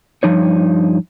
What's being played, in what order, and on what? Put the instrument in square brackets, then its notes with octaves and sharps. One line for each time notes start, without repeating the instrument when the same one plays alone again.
[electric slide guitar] G2 F3 D#4 C#5